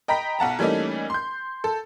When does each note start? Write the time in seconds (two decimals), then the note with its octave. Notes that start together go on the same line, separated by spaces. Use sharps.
0.08 D#5 G5 A#5 B5 B6
0.39 B1 F#5 A5 A#5
0.59 E3 G3 A3 A#3 C#4 D#4
1.10 C6 G6
1.64 A4